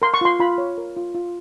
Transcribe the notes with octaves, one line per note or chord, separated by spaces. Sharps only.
A#4 C6
C#6
F4 C6
F4 B5
C#5
A#4
F4
F4